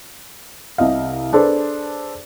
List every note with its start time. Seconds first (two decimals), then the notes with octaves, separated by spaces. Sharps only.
0.78 C2 C3 D#5 F5
1.33 D4 G#4 A4 B4 C5 D5